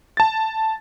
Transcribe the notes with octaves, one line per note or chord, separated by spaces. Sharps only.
A5 A6